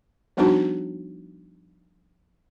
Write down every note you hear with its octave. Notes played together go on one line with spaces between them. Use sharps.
F3 G3 B3 D4 D#4 F#4